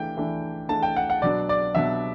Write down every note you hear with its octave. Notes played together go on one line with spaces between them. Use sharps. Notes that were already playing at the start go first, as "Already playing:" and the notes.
Already playing: E3 A3 D4 G5
E3 A3 D4
E3 A3 D4 A5
G5
F#5
F#5
B2 F#3 B3 D4 D5
D5
B2 F#3 B3 D4 E5